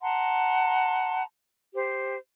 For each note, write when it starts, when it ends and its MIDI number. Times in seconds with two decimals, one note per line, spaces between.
0.01 1.23 78
0.01 1.23 81
0.01 1.23 82
0.01 1.23 84
1.74 2.17 67
1.74 2.17 72